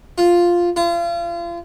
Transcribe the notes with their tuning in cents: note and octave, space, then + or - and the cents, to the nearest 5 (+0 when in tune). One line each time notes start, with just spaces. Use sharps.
F4 +0
F4 -35